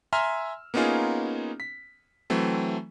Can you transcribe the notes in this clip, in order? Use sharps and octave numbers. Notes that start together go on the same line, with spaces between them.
E5 G#5 A#5 C6 E6 F6
A#3 B3 C#4 D#4 F4 G#4
B6
E3 F#3 A3 C4